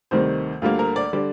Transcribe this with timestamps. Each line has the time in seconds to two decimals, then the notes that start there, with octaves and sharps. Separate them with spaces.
0.11 D2 C3 D#3 G3 C5
0.62 D2 D3 G3 A#3 F4
0.79 A#4
0.96 D5
1.13 D3 G3 D5